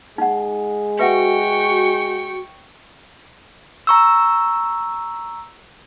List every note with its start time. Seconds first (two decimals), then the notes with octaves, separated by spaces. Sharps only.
0.18 G#3 D#4 F#5
0.99 F#4 B4 E5 F#5 G5 C#6
3.87 A#5 C#6 E6